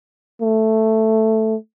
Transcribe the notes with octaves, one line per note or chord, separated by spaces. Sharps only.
A3